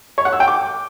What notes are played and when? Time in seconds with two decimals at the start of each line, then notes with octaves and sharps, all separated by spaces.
0.18 C#5
0.25 F#5
0.33 E6
0.40 G5
0.48 D6